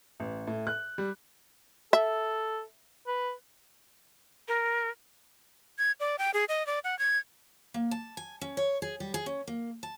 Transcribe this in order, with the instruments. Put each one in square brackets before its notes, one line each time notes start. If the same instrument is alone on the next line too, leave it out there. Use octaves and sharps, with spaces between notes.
[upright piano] A1
A2
F#6
G3
[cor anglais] A4 [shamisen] E5
[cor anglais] B4
[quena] A#4
G#6
D5
G5
G#4
D#5
D5
F#5
G#6
[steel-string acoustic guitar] A#3
A5
G#5
C#4
C#5
G#4
G3
G#4
C#4
A#3
A5